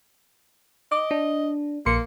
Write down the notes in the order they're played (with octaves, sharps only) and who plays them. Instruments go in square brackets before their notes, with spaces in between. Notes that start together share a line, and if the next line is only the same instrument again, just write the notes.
[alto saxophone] D#5 [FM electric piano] D6
[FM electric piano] D4
[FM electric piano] A#1 C6 C#7 [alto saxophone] A#3